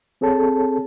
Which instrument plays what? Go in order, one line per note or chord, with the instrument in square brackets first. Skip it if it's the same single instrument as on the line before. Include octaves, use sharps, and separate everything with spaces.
[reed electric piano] C4 G#4 A4 C#5 A5